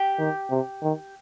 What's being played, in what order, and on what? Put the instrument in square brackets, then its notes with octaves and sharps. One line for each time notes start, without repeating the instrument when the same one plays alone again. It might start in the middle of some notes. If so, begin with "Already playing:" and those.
Already playing: [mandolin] G4
[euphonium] D#3
C3
D#3